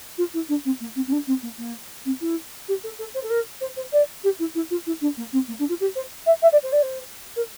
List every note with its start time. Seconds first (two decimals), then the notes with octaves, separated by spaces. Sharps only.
0.18 F4
0.33 E4
0.49 D4
0.65 C4
0.80 A#3
0.95 C4
1.07 C4
1.12 D4
1.27 C4
1.42 A#3
1.58 A#3
2.05 C4
2.21 E4
2.68 G4
2.83 A4
2.98 A4
3.14 C5
3.23 A4
3.30 A#4
3.60 C5
3.76 C5
3.92 D5
4.23 G4
4.39 E4
4.55 E4
4.70 F4
4.86 E4
5.01 D4
5.17 A#3
5.32 C4
5.48 A#3
5.59 D4
5.69 F4
5.80 G4
5.95 C5
6.26 E5
6.42 E5
6.52 D5
6.63 C5
6.72 D5
6.82 C5
7.36 A#4